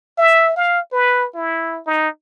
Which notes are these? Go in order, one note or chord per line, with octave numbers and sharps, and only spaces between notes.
E5
F5
B4
E4
D#4